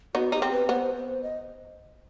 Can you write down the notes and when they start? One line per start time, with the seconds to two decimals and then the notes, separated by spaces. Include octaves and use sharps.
0.15 B3 D#4 F#4
0.32 D#4 G4
0.42 C4
0.51 B4
0.69 B3 C5
0.96 C5
1.23 D#5